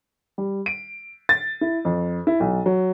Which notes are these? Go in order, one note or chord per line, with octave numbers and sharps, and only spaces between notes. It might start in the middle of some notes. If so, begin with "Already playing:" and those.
G3
D7
A6
E4
F2
E4
B1
F#3